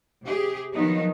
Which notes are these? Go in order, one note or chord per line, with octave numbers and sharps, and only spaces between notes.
C3 G4 G#4
D#3 F3 F#3 B3 D#4